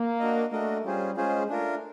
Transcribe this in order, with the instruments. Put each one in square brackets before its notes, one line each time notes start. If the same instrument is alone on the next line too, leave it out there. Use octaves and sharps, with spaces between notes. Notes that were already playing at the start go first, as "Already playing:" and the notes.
Already playing: [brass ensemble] A#3
[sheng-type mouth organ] D4 F#4 A#4 D#5
[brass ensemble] A3 [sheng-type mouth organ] D4 F#4 A#4 D#5
[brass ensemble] G3 [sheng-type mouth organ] C#4 F4 G#4 C5
[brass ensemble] G#3 [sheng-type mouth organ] C#4 F4 G#4 C5
[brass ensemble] A3 [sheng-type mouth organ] D4 F4 A#4